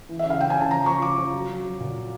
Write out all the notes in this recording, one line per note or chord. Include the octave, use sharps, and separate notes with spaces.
E3
E5
C#3
F5
C#3 G5
G#5
C#3 A5
F3 A#5
F3 C#6
F3 D6
F3
F#3
F#3
F#3
A#2